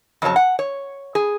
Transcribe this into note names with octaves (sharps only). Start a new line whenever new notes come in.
F2 C#3 F#3 C#5 A5
F#5
C#5
G#4